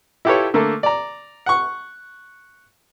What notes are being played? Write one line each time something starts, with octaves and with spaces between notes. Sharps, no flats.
E4 F4 G4 A4 B4 C#5
D3 A3 A#3 A4
D5 A#5
F#5 C#6